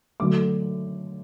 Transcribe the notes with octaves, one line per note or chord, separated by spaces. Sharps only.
D3 F#3 A3 D6